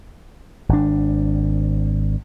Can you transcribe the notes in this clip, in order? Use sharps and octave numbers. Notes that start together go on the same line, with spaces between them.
G#1 D4